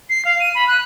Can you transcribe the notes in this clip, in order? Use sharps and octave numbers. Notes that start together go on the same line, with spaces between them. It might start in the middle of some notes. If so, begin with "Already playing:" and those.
C7
F5
D#7
B5
F#6